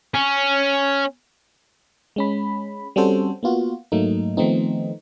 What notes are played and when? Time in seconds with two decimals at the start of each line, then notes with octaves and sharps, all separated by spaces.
0.14 C#4
2.16 G#3 C#4 B5
2.96 G3 C4 C#4 F#4 A4 C5
3.43 A#3 B3 F4 F#4
3.92 G#2 F#3 A3 A#3 D#4
4.37 D#3 F3 A3 B3 C4 D#4